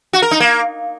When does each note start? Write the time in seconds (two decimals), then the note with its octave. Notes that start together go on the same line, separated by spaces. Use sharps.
0.13 F#4
0.22 A#4
0.31 D#4
0.40 A#3